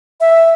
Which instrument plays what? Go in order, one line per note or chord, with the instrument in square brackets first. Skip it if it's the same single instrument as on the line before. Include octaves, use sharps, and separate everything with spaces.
[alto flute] E5